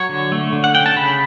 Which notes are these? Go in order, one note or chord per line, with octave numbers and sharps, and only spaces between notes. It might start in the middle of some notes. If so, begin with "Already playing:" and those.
Already playing: F#3 C#5
D3
A3
D3
F#5
C#4 G5
A5
C#3 B5